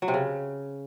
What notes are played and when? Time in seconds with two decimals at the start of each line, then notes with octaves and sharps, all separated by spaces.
0.02 F#3
0.08 C3
0.14 C#3